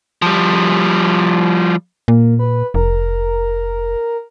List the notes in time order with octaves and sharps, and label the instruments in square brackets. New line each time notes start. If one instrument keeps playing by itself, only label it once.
[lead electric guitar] F3 G3
[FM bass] A#2 [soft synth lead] A#3
[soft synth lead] B4
[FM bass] F1 [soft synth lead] A#4